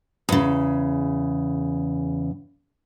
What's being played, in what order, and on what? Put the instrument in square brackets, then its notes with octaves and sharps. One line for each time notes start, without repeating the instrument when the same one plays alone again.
[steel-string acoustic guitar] E2 C#3